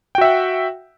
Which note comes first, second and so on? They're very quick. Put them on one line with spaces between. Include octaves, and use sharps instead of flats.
G5 F#4 E5 F#5